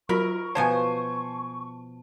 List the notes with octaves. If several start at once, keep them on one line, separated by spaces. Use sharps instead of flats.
F#3 F4 F#4 A#4 B5 C#6
B2 F3 C5 C#5 G#5 A5